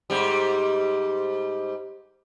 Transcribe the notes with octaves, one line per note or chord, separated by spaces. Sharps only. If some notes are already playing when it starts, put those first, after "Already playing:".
G#2 G3